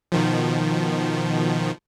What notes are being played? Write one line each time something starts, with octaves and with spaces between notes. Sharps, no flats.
B2 D#3 F3